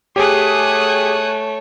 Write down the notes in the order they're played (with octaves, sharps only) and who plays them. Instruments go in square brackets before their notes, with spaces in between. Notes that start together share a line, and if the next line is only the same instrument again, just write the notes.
[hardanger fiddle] A3 C#5 [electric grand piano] G4 G#4 [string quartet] G#5 D#6 F#6